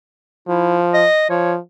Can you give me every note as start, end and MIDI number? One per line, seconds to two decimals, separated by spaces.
0.48 1.04 53
0.48 0.77 64
0.94 1.27 75
1.30 1.57 53
1.30 1.53 73